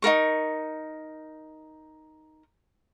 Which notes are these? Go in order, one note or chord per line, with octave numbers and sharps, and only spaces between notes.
D#4 F#4 A#4 C#6